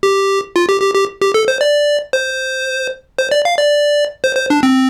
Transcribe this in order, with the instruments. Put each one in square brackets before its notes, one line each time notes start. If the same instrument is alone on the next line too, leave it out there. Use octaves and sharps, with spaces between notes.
[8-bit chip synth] G4
F4
G4
G4
G4
G4
A4
C5
D5
C5
C5
D5
F5
D5
C5
C5
D4
C4